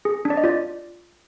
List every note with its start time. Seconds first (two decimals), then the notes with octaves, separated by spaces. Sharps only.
0.05 G#4
0.25 D4
0.30 D5
0.37 D#5
0.44 F4 D5